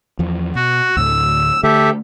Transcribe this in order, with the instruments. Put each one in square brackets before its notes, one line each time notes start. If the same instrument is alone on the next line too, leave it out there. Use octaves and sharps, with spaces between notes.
[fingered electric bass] E2 F3
[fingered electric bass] B2 [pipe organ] F#4
[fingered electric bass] D2 A2 D3 [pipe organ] E6
[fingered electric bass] D3 A3 [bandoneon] G4 A4 E5